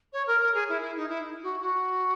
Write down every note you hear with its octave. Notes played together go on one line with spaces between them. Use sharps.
C#5
A#4
A#4
G#4
E4
E4
D#4
E4
F#4
F#4